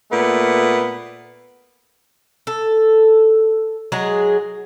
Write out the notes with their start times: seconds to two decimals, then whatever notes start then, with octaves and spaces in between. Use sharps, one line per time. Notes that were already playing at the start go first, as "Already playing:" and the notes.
0.11 A#2 A3 B3
2.47 A4
3.92 F#3 G#3 G#4